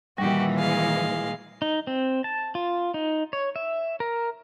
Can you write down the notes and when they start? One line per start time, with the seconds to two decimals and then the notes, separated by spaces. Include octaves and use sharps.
0.18 A#2 D#3 E3 G3 F#4 G4
0.57 G#3 F5
1.62 D#4
1.87 C4
2.24 A5
2.55 F4
2.94 D#4
3.33 C#5
3.56 E5
4.00 A#4